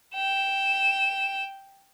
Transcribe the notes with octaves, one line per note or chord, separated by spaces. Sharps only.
G5 E7